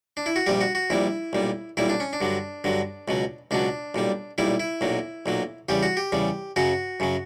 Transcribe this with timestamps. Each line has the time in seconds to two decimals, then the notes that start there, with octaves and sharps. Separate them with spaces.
0.17 D4
0.26 E4
0.36 F#4
0.46 A#1 A#2 G3 G4
0.61 F#4
0.75 F#4
0.90 A#1 A#2 G3 E4
1.33 B1 A#2 G3
1.77 B1 A#2 G3 E4
1.89 D4
2.00 C#4
2.13 D4
2.21 G2 D3 F#3
2.64 G2 D3 F#3
3.08 C#2 B2 F#3
3.51 C#2 B2 F#3 D4
3.94 B1 A#2 G3
4.38 B1 A#2 G3 E4
4.60 E4
4.81 B1 A#2 F#3
5.26 B1 A#2 F#3
5.69 E2 C#3 G3 G4
5.83 F#4
5.97 G4
6.12 E2 C#3 G3
6.56 F#2 C#3 F#3 F#4
7.00 F#2 C#3 F#3